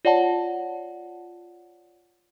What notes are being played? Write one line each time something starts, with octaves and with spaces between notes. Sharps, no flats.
F4 C#5 D5 F#5 A5